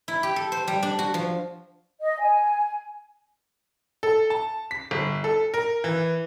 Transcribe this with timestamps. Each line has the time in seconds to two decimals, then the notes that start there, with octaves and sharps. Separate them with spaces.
0.08 E4
0.23 G4
0.36 A4
0.52 C5
0.67 G3
0.83 D4
0.99 F#4
1.14 F3
2.01 D#5
2.20 G#5
4.03 A4
4.30 A5
4.71 B6
4.91 G1
5.24 A4
5.54 A#4
5.84 E3